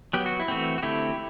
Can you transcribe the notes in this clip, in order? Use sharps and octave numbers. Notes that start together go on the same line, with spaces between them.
F#3 B3 G4
F#4
E4
E3 A3 C4 F#4
F#4
D3 A3 C4 E4 G4